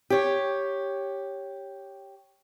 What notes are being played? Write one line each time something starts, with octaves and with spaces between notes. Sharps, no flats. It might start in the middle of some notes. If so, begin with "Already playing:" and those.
G4 C#5